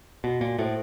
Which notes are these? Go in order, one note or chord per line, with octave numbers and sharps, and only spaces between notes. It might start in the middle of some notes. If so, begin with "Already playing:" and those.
B2 F#4
A#2
A2 A4 C5 E5